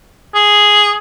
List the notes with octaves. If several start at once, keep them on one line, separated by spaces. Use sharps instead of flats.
G#4